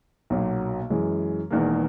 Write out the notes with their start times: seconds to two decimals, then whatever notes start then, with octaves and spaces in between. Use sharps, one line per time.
0.30 B1 A#2 F#3 A#3
0.90 F#2 E3 G#3
1.50 E1 E2 D#3 A#3